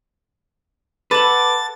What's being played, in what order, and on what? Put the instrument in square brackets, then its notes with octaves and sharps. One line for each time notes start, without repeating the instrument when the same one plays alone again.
[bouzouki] A4 F#5 [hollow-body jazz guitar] B4 [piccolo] D6 [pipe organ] A6